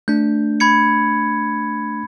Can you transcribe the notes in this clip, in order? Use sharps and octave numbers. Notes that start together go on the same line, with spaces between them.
A3 D4 G6
B5 G#6 C#7